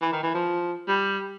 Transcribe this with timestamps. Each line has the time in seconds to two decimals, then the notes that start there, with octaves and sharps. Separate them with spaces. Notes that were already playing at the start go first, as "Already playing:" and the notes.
0.02 E3
0.12 D#3
0.23 E3
0.34 F3
0.88 G3